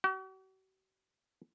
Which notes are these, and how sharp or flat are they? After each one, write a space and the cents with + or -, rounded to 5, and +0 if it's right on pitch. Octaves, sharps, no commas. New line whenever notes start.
F#4 +45